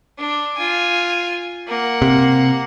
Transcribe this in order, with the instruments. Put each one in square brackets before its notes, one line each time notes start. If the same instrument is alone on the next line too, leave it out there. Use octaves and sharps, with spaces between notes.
[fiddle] D4
F4 G#5
A#3 F#5
[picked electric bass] C3